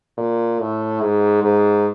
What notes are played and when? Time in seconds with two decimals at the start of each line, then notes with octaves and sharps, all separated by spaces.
0.18 A#2
0.59 A2
1.01 G#2
1.43 G#2